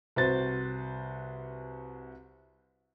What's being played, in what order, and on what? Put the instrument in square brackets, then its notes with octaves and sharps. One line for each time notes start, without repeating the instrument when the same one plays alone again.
[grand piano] C2 F#4 B4 C5 A6